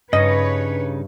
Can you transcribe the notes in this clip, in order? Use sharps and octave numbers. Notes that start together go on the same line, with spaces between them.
G2 C#3 D#4 B4 C#5 D#5